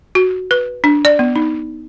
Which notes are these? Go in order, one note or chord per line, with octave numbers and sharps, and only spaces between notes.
F#4
B4
D4
D5
B3
D#4